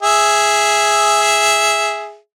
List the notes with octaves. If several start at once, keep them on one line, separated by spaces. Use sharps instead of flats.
G#4 E5